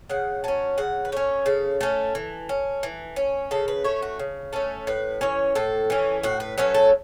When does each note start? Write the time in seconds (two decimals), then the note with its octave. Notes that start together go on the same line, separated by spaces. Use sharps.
0.10 C#3 F#5
0.44 F#3 C#4 A5
0.78 C#3 F#5
1.05 B4
1.12 A3 C#4 C#5
1.46 C#3 A4
1.81 A3 C#4 A4
2.15 E3
2.49 C#4
2.83 E3
3.16 C#4
3.51 C#3 A4
3.68 B4
3.84 A3 C#4 C#5
4.02 F#4
4.19 C#3
4.53 A3 C#4 A4
4.87 A2 B4
5.21 E3 C#4 C#5
5.55 A2 A4
5.90 E3 C#4
6.23 A2 F#4
6.40 B4
6.58 F#3 A3 C#4 B4
6.74 A4